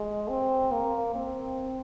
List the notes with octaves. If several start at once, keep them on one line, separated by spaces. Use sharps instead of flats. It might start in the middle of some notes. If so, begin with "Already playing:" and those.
Already playing: G#3
C4
A#3
C4